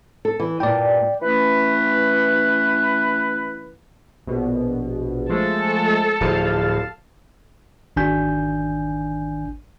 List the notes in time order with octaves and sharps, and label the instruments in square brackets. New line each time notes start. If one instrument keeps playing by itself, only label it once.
[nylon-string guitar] A4
E3
[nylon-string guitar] G2 A#2 [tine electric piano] D5 G5
[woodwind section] E3 A3 C#4 B4
[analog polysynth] A#1 B2
[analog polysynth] F3 G#3 A3 [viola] A4
[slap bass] D1 F3 [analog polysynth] F5 A5
[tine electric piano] G#1 D#3 D4 G#5 G6